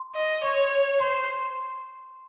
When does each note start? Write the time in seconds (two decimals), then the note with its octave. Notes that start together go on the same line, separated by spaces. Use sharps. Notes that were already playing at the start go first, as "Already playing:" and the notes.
Already playing: C6
0.15 D#5
0.43 C#5 C#6
1.00 C5 C6